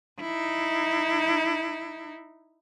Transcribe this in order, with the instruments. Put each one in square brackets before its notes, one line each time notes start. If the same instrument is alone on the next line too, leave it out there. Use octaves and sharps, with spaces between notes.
[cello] D#4 E4